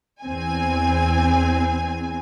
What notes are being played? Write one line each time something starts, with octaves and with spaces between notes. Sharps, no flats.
E2 C4 G#5